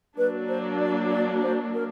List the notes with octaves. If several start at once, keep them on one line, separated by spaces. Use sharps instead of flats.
F#3 A#3 D4 B4
C5
D5
D5
C5
A#4